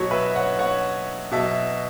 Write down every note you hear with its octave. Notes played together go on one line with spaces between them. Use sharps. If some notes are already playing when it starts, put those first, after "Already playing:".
Already playing: B2 F#3 C#5
B4 E5
C#5 F#5
C#5 F#5
B2 F#3 E5 A5